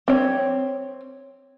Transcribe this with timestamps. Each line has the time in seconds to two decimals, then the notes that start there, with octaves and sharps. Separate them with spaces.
0.08 C4 C#5